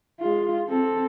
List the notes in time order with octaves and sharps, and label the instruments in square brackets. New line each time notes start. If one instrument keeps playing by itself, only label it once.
[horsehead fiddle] G#3 F4
C4 A4